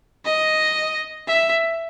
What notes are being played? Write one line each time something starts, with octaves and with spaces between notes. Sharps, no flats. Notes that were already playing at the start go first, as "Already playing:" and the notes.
D#5
E5